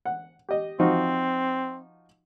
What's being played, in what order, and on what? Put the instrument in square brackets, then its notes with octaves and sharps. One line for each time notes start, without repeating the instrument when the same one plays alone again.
[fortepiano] F#5
G4 D#5
[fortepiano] F3 D#4 F#4 [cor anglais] C4